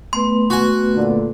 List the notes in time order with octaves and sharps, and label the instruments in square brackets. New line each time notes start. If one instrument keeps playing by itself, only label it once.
[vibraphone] A3 B3 B4 [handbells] C6
[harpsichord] F#4 G#5
[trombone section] A#2 D3